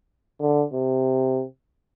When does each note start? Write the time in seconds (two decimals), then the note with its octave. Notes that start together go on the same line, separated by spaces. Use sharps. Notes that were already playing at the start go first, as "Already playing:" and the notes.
0.41 D3
0.73 C3